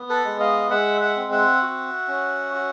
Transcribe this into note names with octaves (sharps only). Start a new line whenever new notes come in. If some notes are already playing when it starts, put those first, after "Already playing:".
Already playing: B3
A4 B4
G#3
D#5 F5
G#3 E5 F#5
E5 F#5
C4
E5 F#5
F#4
C#4
F#4